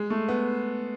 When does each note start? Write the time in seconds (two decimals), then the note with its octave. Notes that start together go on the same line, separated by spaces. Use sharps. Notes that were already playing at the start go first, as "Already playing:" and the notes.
Already playing: G#3
0.10 A3
0.28 B3